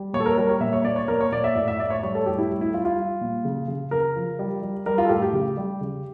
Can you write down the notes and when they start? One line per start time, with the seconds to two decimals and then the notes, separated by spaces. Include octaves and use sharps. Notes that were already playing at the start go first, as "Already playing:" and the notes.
Already playing: G3
0.13 A#2 C#5
0.20 A4
0.26 A#4
0.38 G3 A#4
0.49 C#5
0.60 A#2 E5
0.73 C#5
0.84 A#2 D5
0.96 C#5
1.08 A#2 A#4
1.21 C#5
1.32 A#2 D5
1.44 E5
1.55 A2 D5
1.68 E5
1.79 A2 D5
1.90 C#5
2.03 G3 C#5
2.15 A4
2.26 A2 G4
2.38 E4
2.50 G3
2.61 E4
2.74 G3 F4
2.85 F4
2.97 G3
3.21 A#2
3.45 C#3
3.68 C#3
3.91 C#3 A#4
4.16 F3
4.39 G3
4.62 G3
4.86 G3 A#4
4.98 F4
5.05 A4
5.09 A2 G4
5.22 G4
5.33 C#3
5.57 G3
5.81 C#3